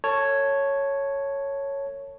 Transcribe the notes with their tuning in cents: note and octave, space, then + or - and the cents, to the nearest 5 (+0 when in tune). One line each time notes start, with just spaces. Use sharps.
A#4 -45 C#5 +0 A5 +0